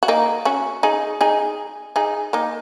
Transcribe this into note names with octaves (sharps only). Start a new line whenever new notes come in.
F#4
A#3 D#4
C#4 F#4
D#4 G#4
D#4 G#4
D#4 G#4
A#3 D#4